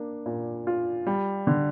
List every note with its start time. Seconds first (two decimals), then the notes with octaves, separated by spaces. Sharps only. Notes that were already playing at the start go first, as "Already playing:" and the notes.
Already playing: A#3 D4
0.26 A#2
0.67 F4
1.07 G3
1.47 D3